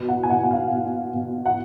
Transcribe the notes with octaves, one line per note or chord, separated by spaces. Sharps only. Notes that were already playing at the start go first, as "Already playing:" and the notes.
Already playing: B2
F#5
G#5
B2 F#5
F#5
F5
B2
B2
F#5